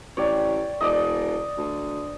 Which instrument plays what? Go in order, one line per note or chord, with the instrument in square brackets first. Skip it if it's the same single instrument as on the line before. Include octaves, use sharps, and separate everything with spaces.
[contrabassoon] A1 [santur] C#5 D5 G5
[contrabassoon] E1 [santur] D5 D#5
[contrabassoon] D2